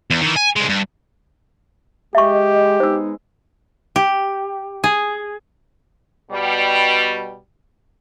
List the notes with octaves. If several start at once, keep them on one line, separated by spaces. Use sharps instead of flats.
E2
D#3 E3
G#5
C2 G#3
G2
G#3 G4 D#5 E5 C#6
G#3 B3 D#4 C5 E6
G4
G#4
B2 G3